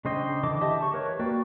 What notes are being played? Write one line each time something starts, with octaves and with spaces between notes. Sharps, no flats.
C#3 D4 C5 D#5 G5
D3 E3 D#5 A5 D6
G4 D#5 E5 A5
A5 C#6
A#4 B4 C#5
A#3 F#4 B4 D5 G5